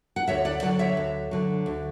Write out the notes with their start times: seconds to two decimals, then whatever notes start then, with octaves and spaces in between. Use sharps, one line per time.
0.16 F#5
0.28 D2 C#5 E5
0.45 D5 F#5
0.62 D3 F#3 D5 F#5
0.79 C#5 E5
0.97 D2
1.31 D3 F#3
1.66 D2